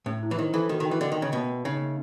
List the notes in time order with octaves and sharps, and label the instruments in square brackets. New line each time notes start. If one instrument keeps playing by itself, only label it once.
[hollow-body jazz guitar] A2 [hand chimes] C#4
[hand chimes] E4
[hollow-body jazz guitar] E3
[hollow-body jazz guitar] D#3 [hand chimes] C5
[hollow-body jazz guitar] E3 [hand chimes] A4
[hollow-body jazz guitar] D#3 [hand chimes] F#4
[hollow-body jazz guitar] D#3
[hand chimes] G5
[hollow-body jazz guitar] E3
[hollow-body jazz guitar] D3 [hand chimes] D#5
[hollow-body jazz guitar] D#3
[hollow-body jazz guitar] C#3 [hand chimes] G5
[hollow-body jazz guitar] B2 [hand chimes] A#3
[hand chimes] A#3
[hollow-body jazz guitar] C#3 [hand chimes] D#4
[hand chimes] A#3